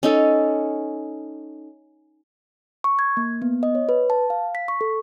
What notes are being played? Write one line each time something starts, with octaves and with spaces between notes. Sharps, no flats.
C#4 D#4 A4
C#6
G#6
A#3
B3
D#5
C#5
B4
A5
F5
B6
C#6
A4